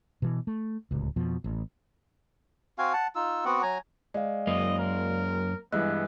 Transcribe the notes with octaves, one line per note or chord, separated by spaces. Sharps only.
B2 E3
A3
D1 C#2
F2 B2 F3
A1
C4 F#4 F5 G#5
F#5 A5
D#4 F4 E6
B3 C4 F#4 F#5
F#3 G#5 A#5
G#3 D5 F5
F#2 A#3 D#5
A#4
G2 E3 G#3 B3 E6 F#6